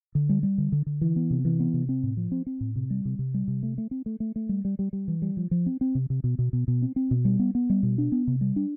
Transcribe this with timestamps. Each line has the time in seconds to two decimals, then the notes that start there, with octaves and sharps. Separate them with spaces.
0.15 D3
0.29 G3
0.43 G3
0.58 D3
0.72 D3
0.86 D3
1.01 E3
1.16 B3
1.31 C3
1.45 E3
1.60 B3
1.74 C3
1.89 C4
2.03 A2
2.17 F3
2.32 C4
2.46 C4
2.61 A2
2.76 C3
2.90 G3
3.05 C3
3.19 C3
3.34 G3
3.48 C3
3.63 A3
3.78 A3
3.91 C4
4.06 A3
4.20 A3
4.36 A3
4.49 G3
4.65 G3
4.79 G3
4.93 G3
5.08 E3
5.22 G3
5.37 F3
5.51 F3
5.66 C4
5.81 C4
5.95 C3
6.10 C3
6.24 B2
6.39 B2
6.53 B2
6.68 B2
6.82 C4
6.96 C4
7.11 B2
7.25 G3
7.39 B3
7.55 B3
7.70 G3
7.83 B2
7.98 D4
8.12 B3
8.27 C3
8.41 G3
8.56 D4